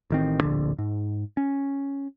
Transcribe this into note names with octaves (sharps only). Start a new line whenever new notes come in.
A1 D#3 C4
D1 A#1 D3
G#2
C#4